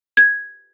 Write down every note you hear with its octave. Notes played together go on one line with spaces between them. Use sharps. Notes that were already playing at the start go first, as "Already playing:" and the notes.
G#6